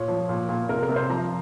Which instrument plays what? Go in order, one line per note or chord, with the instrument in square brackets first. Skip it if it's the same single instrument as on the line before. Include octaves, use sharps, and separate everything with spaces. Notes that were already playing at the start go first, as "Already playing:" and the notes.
Already playing: [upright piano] A#2 C#5
F3
A#2
A#2
C3 A#4
A#4
C3
C5
F3 A#5